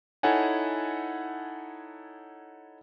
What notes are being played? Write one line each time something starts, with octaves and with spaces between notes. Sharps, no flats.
D#4 E4 A4 C#5 F#5 G#5